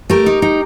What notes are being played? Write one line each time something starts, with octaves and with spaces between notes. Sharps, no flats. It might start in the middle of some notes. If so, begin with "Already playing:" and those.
A3 G4 A#4
D#4
D#4